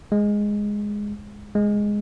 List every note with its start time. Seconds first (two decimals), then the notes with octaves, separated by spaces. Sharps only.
0.12 G#3
1.55 G#3